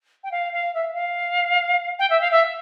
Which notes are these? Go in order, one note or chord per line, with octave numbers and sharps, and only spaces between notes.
G5
F5
F5
E5
F5
G5
E5
F5
E5